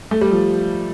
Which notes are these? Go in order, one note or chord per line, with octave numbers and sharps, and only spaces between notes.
A3
G3
F3